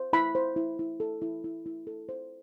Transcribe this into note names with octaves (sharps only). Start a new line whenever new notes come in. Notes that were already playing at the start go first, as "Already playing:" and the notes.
Already playing: C5
E4 B5
C5
E4
E4
A4
E4
E4
E4
A4
C5